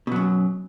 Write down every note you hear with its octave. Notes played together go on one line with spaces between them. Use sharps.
F#2 B2 F#3